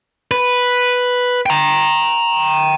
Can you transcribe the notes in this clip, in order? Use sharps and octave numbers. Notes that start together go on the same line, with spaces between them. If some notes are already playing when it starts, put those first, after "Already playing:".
B4
G5 A#5